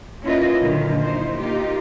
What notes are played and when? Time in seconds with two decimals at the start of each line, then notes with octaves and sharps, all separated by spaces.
0.23 A#3 C#4 E4 F4 B4 D#5
0.58 A#2 D3 D#3 F#3
1.01 A#3 D#4 E4 C5
1.37 A#3 D#4 F4 G4